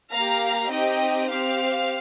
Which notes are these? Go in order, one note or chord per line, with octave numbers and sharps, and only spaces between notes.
A#3 G4 F5 A#5
C4 D#4 G4 D#5 G5
C4 G4 C5 F5